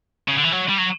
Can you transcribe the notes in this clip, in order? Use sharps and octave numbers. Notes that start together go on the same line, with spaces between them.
C#3
D3
E3
F#3
G3
F#3